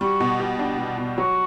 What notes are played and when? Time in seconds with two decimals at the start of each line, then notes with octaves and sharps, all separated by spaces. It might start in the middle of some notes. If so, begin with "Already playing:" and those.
0.01 G3 F#4
0.20 B2
0.40 G4
0.59 D4
0.79 G3
0.98 B2
1.18 F#3 F#4